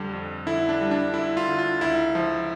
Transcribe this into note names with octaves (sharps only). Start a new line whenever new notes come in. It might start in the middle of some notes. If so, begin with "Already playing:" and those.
Already playing: F2 D3 G3
F2
D3 E4
D4
G3
D4
D3 E4
F4
D3
F4
C#2 E4
F3